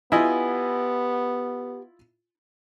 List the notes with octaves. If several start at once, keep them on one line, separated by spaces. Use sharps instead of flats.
B3 E4 F4 G4 D#5 G#5